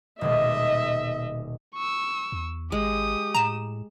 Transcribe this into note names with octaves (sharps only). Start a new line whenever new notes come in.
D#1 B2 G#3 D#5 E5
C#6 E6
E2
G#1 G#3 G4 D#6
A2 A#5 E7